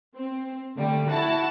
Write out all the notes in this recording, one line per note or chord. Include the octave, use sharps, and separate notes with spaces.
C4
D3 G3 A3
E4 F#4 F#5 A5